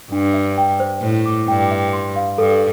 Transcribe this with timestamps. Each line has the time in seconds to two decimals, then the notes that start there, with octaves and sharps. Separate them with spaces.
0.12 G2 D4
0.34 E5
0.58 G5
0.80 C5
1.02 A2 C5
1.26 D6
1.48 G2 G5
1.71 E5
1.93 C6
2.16 F5
2.38 G2 A4